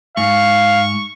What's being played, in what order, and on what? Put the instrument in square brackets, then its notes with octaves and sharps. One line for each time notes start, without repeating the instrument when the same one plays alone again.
[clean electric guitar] G#2 [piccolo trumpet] F5 [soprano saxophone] C#6